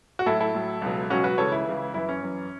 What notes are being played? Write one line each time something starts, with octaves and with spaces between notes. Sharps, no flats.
F#4
A2 F#3 E4 A4
E4 A4
A2 F#3
C#2 B2 F#3
C#2 B2 F#3 C#4 F#4
F#4 B4
C#2 C#3 E3 A4 C#5
E4
C#2 C#3 E3
F#2 E3 E4
C#4
F#2 E3